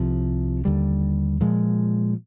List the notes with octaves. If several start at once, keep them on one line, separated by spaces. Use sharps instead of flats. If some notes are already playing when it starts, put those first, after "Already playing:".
Already playing: C2 C3 F3
D#2 D3 G3
A#2 F3 G#3